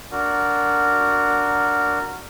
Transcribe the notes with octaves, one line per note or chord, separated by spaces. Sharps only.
D4 F#4 A#4